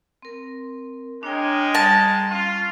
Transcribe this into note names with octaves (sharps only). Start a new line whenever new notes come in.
C4 A#4
G#3 D4 D#4 A#4 C#5 G5
G3 A5
C#4 F4